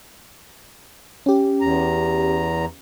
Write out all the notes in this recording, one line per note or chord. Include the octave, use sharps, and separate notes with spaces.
C#4 G4
E2 A#5